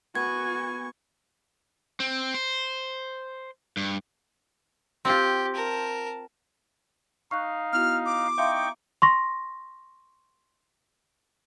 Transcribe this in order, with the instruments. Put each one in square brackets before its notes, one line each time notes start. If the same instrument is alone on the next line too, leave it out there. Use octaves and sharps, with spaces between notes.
[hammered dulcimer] B3 [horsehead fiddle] F#4 G#5 [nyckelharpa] C#6 [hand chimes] G#6
[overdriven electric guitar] C4
C5
G2
[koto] C4 F4 [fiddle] G4 [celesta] C6 G6
[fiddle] A#4 A5
[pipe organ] D#4 F5 [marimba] C#6 D#6 F#6
[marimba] B3 E4 F#4 [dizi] F6
[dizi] D6
[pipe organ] D#4 G5 C#6 [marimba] E5 F5 C6
[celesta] C6 C#6 A#6